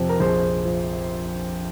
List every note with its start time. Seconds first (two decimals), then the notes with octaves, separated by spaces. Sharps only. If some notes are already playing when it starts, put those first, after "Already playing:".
Already playing: F2 C3
0.09 A#4
0.20 A#1 G#4 C5
0.65 F3